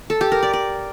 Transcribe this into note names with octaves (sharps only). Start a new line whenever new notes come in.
A4
G4
A#4
D5
D5